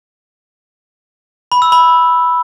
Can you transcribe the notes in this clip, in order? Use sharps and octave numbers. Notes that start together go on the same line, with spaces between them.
B5
E6
B5